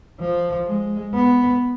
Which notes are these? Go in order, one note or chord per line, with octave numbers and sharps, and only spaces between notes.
F3
G#3
B3